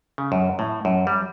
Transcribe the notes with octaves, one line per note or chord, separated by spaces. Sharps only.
C#3
F#2
A2
F#2
G3